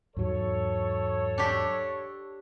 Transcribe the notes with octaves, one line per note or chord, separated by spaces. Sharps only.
E2 G#2 F#3 A4 C#5
D4 G4